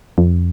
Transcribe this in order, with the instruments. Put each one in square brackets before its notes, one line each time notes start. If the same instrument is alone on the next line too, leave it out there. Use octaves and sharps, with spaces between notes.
[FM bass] F2